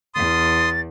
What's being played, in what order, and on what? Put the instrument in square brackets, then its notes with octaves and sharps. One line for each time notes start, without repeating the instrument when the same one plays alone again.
[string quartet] E2 [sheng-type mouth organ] C6 D#6 [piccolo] A6